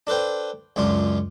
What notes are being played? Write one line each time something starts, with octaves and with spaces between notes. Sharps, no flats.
D4 A4 B4 C5 G5
C#2 F#2 D4 F4